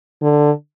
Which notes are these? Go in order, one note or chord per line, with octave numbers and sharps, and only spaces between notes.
D3